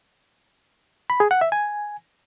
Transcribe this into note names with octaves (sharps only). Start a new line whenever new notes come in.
B5
G#4
F#5
E5
G#5